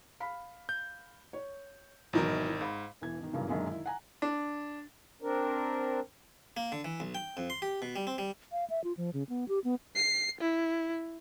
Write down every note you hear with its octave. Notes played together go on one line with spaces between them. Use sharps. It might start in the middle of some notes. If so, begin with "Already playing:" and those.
F5 B5 B6
G6
C#5
G#1 B2 E3 F#3 D#4 A#4
G#2 F5 B5
E1 E3 G#6
B2 D#3
G2 C#3 E3 F#3 A#3
F#2 A#2 D3 D#3 F#3 G#3
D#3 E4
F#5 G#5 A#5
D4
C4 D4 A#4
A#3
D3
E3
B1
G5
F2
C6
G4
B2
G3
C4
G3
F5
E5
F4
F3
C#3
B3
G4
B3
C7
E4